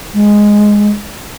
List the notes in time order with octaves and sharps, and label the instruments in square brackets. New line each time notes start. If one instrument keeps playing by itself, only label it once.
[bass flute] G#3